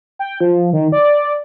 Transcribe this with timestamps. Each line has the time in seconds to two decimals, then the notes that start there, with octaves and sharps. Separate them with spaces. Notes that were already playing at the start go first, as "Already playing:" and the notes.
0.19 G5
0.40 F3
0.73 D#3
0.92 D5